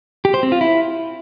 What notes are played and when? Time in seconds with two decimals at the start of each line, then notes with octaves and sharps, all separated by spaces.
0.25 G4
0.34 C5
0.43 C4
0.52 F4
0.61 E4